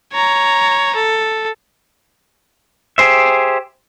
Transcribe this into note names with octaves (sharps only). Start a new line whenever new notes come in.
C#5 A#5
A4
G4 G#4 C5 E5